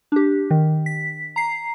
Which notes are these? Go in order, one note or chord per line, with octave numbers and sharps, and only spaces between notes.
D4 G4
D#3
B6
A#5 C7